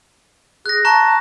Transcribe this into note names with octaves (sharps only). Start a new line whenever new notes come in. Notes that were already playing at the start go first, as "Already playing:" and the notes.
G#4 F#6 A#6
A5 A#5 C#6 F#6